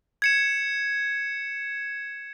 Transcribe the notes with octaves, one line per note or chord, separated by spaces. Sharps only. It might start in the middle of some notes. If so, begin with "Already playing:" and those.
G#6 C#7 E7